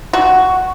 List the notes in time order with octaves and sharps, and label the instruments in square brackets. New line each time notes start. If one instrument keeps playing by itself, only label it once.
[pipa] F#4